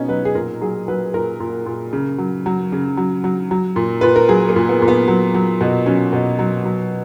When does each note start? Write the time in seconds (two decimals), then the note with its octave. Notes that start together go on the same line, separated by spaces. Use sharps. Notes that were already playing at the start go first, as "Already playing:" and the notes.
Already playing: B2 B3 C#4 D#4
0.08 F#3 B4
0.25 G#4
0.35 A#2 A#4
0.61 F#3 G#4
0.88 F#3 B4
1.14 A#2 A#4
1.40 A#2
1.66 A#2
1.93 C#3
2.18 F#3
2.46 F#3
2.72 C#3
2.97 F#3
3.24 F#3
3.51 F#3
3.76 A#2
4.01 A#2 B4
4.16 A#4
4.29 F#3 G#4
4.49 A#3
4.56 A#2
4.69 B3
4.82 A#2
4.88 B3
5.08 F#3
5.34 F#3
5.61 B2
5.86 F#3 C#4
6.13 B2
6.39 F#3
6.65 F#3